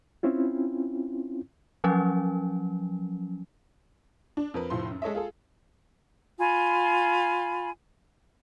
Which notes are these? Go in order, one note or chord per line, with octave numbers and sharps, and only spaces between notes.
C4 C#4 E4 F4
F3 F#3 C#4
D4
F2 A#4 B4
F1 A2 F3 C6
F#2
G#3 A4 C#5 D#5 E5
F4 G#4 A4
F4 G#5 B5